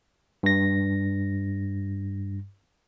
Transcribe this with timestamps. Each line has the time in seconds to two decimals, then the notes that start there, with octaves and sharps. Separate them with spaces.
0.43 G2 A#6